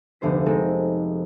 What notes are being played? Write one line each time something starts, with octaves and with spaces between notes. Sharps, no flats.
F1 D2 B3 C5 B6
G#3 C4 D#4 A4 A#4